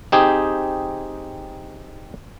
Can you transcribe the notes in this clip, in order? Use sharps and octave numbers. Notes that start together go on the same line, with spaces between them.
C4 D#4 G4 G#4